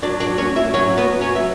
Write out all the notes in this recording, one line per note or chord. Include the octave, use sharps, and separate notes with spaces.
F#3 D4 D5
D4 D5
F#3
C#4 C#5
A2
E4 E5
F#3 C#4 C#5
F#3 B3 B4
F#3 C#4 C#5
E5